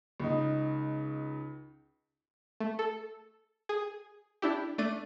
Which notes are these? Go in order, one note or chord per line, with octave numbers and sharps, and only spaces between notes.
C#2 D#4
A3
A4
G#4
D4 E4 G4
A3 D4 D7 D#7